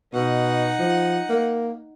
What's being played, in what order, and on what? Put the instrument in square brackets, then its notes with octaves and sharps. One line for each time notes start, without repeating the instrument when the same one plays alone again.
[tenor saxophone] B2 [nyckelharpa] D#4 F#5
[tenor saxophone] F3
A#3